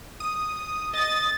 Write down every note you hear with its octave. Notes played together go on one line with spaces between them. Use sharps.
D#6
D#5 D#6 A6